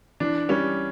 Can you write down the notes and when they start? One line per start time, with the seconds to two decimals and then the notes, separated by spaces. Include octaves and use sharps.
0.20 E3 D4
0.49 G3 C#4